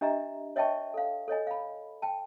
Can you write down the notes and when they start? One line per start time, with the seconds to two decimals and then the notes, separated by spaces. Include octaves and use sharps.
0.01 D4 G4 D#5 E5 A#5
0.56 C#5 D#5 E5 G5 A5 C#6
0.94 A4 F5
1.28 A4 C#5 D#5 G#5
1.47 F5 B5
2.02 G5 A5